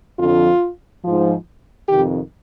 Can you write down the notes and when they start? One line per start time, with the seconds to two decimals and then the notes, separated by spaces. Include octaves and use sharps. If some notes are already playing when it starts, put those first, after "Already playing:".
0.19 F2 D3 F3 F4
1.04 G#2 F3
1.89 F2 C3 D#3 G4